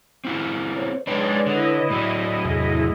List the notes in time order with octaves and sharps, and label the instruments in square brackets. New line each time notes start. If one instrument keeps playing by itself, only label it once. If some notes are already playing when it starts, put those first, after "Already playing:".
[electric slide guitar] C4 E4 F4
[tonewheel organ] C5 C#5
[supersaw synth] G#3 D5 [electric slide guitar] D4 D#4 G5 [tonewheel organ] B4 C#5
[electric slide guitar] D3 [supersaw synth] E4 D#5
[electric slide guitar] A2 F#3 [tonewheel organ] D5
[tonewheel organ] E2 C3 G#4